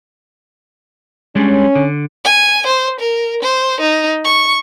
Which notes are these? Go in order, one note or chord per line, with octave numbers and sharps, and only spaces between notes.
G3 G#3 C#4 D4
D3
G#5
C5
A#4
C5
D#4
C#6